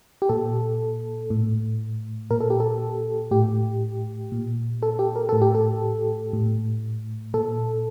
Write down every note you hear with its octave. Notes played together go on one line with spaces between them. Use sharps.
G4
A#2 A4
A2
A#2 A#4
A4
G4
A4
A2 G4
A#2
A4
G4
A#4
A2 A4
G4
A4
A2
A#2 A4